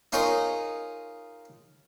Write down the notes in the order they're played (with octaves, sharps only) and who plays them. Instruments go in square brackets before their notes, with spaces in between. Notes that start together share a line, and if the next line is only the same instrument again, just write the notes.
[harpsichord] D#4 F4 G#4 A#4 C#5 D#5